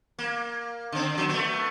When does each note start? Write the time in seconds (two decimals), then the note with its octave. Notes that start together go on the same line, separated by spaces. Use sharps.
0.18 A#3
0.92 D3 C4
1.15 D3 F#3
1.29 A3 B3